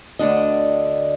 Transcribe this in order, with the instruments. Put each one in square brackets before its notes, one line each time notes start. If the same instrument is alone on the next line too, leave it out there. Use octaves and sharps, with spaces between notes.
[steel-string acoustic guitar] D2 D3 D4 D#5